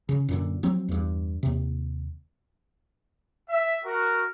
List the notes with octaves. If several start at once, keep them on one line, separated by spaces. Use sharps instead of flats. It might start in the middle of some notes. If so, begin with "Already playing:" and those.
C#3
F#2 A#2 D3
F3 F#3 C4
E2 G2
D#2 C3
E5
F#4 A#4